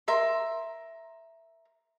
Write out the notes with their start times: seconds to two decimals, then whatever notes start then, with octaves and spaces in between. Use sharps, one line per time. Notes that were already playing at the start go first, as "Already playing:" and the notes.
0.08 A#4 E5 C6